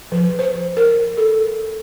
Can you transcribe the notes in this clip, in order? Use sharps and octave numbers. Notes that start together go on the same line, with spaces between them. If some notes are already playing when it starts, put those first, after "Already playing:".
F3
C5
A#4
A4